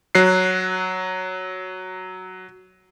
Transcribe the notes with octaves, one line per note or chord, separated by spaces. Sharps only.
F#3 F#6 C7